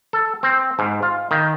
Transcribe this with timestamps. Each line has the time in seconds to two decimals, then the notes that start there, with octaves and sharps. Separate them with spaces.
0.13 A4
0.43 C4
0.79 G#2
1.03 F4
1.31 D#3